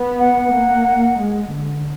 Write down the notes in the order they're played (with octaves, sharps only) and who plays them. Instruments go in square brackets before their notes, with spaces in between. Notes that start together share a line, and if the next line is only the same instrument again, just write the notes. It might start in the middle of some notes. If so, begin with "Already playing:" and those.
Already playing: [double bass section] B3
[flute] F#5
[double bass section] A#3
G#3
D3